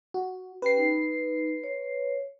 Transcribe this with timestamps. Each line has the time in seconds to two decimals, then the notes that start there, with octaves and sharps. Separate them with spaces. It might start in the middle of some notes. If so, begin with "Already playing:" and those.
0.14 F#4
0.62 C#4 G4 B4 G5 C7
0.77 D#4
1.64 C#5